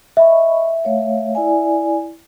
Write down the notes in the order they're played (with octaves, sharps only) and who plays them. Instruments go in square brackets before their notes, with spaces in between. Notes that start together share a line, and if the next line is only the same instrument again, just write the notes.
[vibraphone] D#5 B5 C#6 [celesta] E5
[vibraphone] A3 C#5 F5
E4 D5 G#5